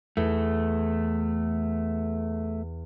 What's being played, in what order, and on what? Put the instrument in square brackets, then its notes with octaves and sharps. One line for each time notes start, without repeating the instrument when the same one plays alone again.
[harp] E2 [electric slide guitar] A3